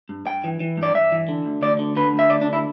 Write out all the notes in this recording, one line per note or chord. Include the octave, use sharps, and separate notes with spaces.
G2
G2 G5
E3
E3
G2
D5
G2 E5
E3
D3
D2
D2 D5
D3
D3 B4
D2
E5
D2 D5
D4
D3
E4